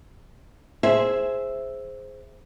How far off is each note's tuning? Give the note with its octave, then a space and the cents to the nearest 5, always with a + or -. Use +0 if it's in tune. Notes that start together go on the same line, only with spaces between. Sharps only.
G#4 +5 C5 +0 E5 +0